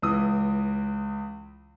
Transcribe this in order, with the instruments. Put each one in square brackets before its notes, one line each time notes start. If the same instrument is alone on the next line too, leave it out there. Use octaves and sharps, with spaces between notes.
[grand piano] C#2 E3 D#6